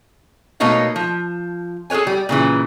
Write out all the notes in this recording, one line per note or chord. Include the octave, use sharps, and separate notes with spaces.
B2 A3 A#3 D#4 C#5 F5
F3
G#4 A4 B4 C#5 G#5
G3
A#2 C#3 E3